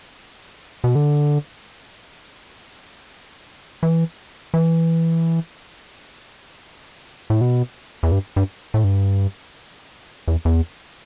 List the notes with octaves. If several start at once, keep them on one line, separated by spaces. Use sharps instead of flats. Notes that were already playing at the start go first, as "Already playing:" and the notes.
B2
D3
E3
E3
A2
B2
E2
G2
G2
A2
G2
E2
E2